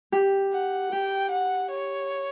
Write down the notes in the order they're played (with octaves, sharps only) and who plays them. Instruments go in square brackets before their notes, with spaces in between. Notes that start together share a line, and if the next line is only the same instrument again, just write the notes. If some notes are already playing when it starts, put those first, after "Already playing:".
[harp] G4
[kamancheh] F#5
[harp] G4 [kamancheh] G5
[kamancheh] F#5
C#5